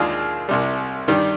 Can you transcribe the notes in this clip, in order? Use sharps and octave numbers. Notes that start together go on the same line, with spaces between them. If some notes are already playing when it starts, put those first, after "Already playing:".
Already playing: D#2 D#3 G#3 D4 F4 G#4
C2 C3 G3
G2 D#3 G3 D4